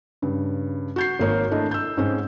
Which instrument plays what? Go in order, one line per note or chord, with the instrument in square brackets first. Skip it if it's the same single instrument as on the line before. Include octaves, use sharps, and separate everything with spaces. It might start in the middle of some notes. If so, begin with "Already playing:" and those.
[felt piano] G2 C#3
F#4 G6 C7
G#1 A#3 C#5
A3 D4 E4 D#5
E6 G6
G#2 G#3 C4 C#4